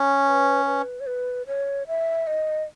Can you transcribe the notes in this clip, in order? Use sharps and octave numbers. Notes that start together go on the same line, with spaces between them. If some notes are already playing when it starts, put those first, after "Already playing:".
Already playing: C#4
B4
B4
C#5
B4
C#5
E5
D#5